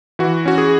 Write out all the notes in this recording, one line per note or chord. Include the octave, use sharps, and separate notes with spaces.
E3 F#4
C#4 F#4
G#4